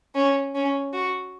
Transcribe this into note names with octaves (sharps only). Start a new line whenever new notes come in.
C#4
C#4
F#4